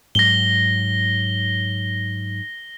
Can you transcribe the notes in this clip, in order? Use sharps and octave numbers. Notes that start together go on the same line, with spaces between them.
G#2 F#3 A#6 G7